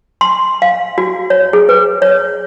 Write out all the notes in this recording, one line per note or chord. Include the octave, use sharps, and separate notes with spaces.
C6
F5
F#4
C#5
G#4
B4
C#5